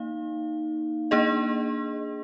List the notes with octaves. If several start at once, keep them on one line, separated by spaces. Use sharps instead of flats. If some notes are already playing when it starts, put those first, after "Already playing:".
Already playing: A#3 D#4 F5
A#3 D4 G#4 D#5